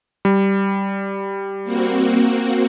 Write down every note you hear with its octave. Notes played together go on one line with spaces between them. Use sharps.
G3
A#3 C4 F#4